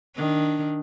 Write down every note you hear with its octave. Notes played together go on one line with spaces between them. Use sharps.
D#3 D4